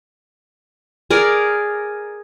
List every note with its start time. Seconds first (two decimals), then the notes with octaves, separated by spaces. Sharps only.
1.10 G#4 A#4 D5